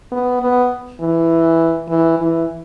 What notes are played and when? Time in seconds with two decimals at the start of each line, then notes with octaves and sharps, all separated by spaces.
0.12 B3
0.42 B3
1.00 E3
1.89 E3
2.18 E3